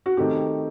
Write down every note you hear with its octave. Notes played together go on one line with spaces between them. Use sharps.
F#4
D#3 A3 C4 G4